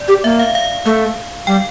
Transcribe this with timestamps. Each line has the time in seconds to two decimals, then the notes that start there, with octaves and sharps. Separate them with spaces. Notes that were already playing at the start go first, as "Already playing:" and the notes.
Already playing: D5
0.08 G4
0.24 A#3 E5
0.39 F5
0.55 F5
0.86 A3
1.47 G3 G5